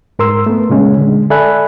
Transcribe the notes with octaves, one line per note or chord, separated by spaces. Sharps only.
G#2 A#4 C6 E6
A3 B3
A#2 C#3 G#3 C#4
D3 G#3
A4 D5 E5 G#5 B5 F#6